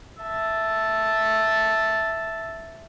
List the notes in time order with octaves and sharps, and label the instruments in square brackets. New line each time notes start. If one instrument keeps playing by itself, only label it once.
[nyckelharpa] E5 A5